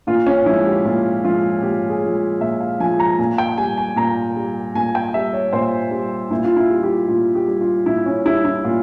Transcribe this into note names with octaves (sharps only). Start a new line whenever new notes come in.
A#2 F4
C#4
F3 G#3 E4
G4
A#2 F4
F3 G#3 F4
A#2 G4
G#4
F3 G#3
A#2 E5
F5
F3 G#3 G#5
A#5
A#2 G#5
G5
G3 G#5
G#5
A#2 A#5
G3
A#2 G#5
G5
G3 E5
C#5
A#2 C5
G3
A#2 E4
F4
E4
G3
F4
G4
A#2 F4
G4
G3
F4
A#2 E4
C#4
G3 E4
E4
A#2 F4